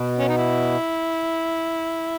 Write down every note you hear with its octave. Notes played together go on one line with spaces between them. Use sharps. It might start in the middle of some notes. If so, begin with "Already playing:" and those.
Already playing: B2
C#4
D#4
E4